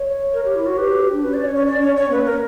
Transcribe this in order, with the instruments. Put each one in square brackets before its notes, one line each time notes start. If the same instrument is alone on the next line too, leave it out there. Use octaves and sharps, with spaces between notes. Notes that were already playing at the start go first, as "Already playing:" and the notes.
Already playing: [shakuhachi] C#5
[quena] A#4
G4
E4
[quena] F#4 [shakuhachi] C#5
[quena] G4 [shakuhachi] B4
[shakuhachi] B4
F#4
D4
[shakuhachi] C#4 [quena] B4
[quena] D5
C#5
C#5
D5
C#5
C#5
[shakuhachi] A#3 [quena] B4
[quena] A#4